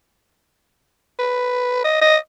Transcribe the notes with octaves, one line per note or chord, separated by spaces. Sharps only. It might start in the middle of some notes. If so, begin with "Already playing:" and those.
B4
D#5
D#5